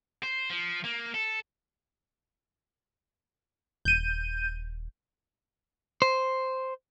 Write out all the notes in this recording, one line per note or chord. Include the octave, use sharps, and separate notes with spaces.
C5
F3
A#3
A4
D#1 G6 D#7
C5